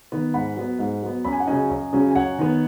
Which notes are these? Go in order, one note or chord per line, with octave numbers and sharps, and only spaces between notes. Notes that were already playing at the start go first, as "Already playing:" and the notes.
D#3 B3
G#2 F#5 B5
F#3 B3
G#2
F#3 B3
F#2 B5
G#5
F#5
C#3 F#3 C#4 D#5 G#5
F#2
C#3 F#3 C#4
G#5
F#2 C#5 F#5
D#3 B3